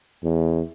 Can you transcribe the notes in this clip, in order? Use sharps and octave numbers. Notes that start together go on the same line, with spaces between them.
E2